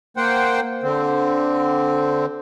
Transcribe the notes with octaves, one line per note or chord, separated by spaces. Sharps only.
A#3 C5 F#5 G5
D3 C4